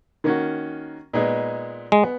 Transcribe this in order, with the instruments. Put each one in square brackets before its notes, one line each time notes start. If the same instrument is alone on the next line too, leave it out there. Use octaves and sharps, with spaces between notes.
[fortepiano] D#3 A#3 C#4 F#4
A#2 G#3 B3 D#4 G#4
[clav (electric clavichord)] G#3
[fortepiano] B3